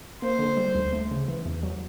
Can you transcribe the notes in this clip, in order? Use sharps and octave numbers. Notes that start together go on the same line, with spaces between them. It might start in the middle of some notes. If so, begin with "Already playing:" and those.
A#3 C5
D3
G3
D2
A3
C#3
E3
E2
F#3